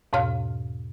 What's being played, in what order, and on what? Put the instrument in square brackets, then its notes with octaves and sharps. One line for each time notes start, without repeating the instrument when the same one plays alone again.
[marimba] E2 G#2 B2 C#5 F5 F6